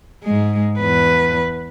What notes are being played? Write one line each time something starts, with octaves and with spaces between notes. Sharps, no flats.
G#2 G#3
E2 B4